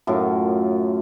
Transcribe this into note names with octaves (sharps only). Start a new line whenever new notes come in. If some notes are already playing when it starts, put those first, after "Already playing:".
F#2 A2 F4 A#4